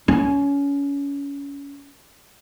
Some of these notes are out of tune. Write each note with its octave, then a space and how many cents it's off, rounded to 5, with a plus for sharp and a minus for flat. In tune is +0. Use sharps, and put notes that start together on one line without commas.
C#4 +25